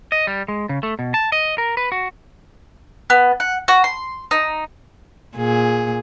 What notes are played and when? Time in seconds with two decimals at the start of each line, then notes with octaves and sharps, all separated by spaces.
0.12 D#5
0.27 G3
0.48 G#3
0.69 C#3
0.83 A3
0.99 B2
1.14 A5
1.32 D#5
1.58 A#4
1.77 B4
1.92 F#4
3.10 B3
3.40 F#5
3.68 F#4
3.84 C6
4.31 D#4
5.36 A#2 G#4